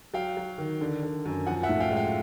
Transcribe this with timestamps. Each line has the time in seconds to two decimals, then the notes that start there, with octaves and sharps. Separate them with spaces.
0.14 F#3 F5 G5
0.37 F#3
0.58 D#3
0.81 D3
1.03 D3
1.25 F#2
1.46 F3 F#5 G#5
1.63 E5 F#5
1.69 A2
1.80 F5 G5
1.91 G#3
1.96 F5 G5